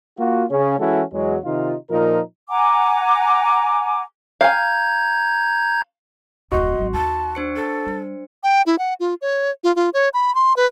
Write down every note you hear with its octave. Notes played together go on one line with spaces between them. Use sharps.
A#3 F4 F#4
C#3 C#4
E3 G#3 C#4 E4 F#4 A4
E2 F#3 G#3
C3 D#3 D#4 F4
A#2 F3 D#4 A#4
F#5 G#5 A#5 D6
F5 G#5 A#5 G6 G#6
D1 F2 F#4 D#5 C6
G#1 F#3
D#2 A5
D4 C5 C#7
A4
G3
G5
E4
F#5
F4
C#5
F4
F4
C#5
B5
C6
B4